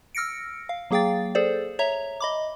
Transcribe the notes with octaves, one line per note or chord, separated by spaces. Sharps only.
E6 F6 A#6 C#7 D7
F5
F#3 A#3 G#4 F5 G5 A6
G#4 A4 C5 D5
C#5 E5 A#5
D#5 B5 D6